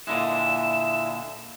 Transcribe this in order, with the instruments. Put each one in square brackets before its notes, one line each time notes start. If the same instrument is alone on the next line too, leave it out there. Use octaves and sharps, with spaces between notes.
[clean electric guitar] A#2 D3 G#3 [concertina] E4 E5 [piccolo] E7